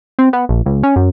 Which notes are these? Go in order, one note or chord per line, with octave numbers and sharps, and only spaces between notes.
C4
B3
A#1
C#2
C#4
F#2